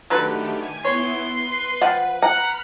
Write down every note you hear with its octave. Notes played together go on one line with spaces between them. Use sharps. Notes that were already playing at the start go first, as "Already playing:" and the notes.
D3 D#3 F#3 A3 G4 B4
G#5
B3 E4 C#5 C6
B4
F3 F#5
F#5 A#5 B5 F6 F#6